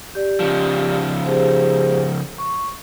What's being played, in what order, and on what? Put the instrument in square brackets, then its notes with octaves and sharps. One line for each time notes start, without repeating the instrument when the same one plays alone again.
[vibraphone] G4 D5
[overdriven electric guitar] C#3 F3
[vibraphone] G4 G#4 C5
C#6